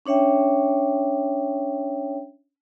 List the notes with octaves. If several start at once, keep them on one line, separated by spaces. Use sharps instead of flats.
C#4 D4 C#5 E5 G5